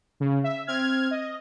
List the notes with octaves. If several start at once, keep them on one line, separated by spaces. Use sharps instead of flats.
C#3
E5
C4 F6 G#6
D#5